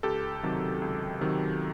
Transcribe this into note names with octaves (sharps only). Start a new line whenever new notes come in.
C#2 G4 A4
C3 D#3 F#3
C#2
C3 D#3 F#3